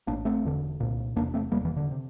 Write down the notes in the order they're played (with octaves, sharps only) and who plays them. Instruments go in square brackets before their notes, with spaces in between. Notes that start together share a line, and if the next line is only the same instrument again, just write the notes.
[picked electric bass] A1 A2 A#3 D4
A3 C4
E1 E2 D3
C2 A#2
E1 E2 C3 A#3 D4
A3 C4
F1 E2 C3 G3 A#3
E3
D3
C3